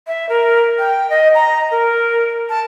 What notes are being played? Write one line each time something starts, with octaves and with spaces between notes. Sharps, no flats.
E5
A#4
G5
D#5
A#5
A#4
A5